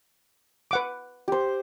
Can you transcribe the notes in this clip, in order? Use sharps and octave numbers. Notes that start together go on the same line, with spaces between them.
B4 F#5 D6
G4 C5